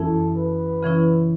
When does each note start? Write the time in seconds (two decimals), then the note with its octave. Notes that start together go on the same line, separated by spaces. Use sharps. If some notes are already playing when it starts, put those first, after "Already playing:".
Already playing: F#2 E3 C#4 E4 A4
0.37 B4
0.83 C#3 E3 C#4 E4